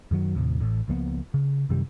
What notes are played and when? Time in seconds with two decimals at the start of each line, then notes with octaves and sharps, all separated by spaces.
0.11 F#2 D#3 F#3
0.36 D#2 A2 C3
0.60 A1 A2
0.88 C#2 F3 A#3 B3
1.34 C#3
1.69 F#2 C3 D#3 G3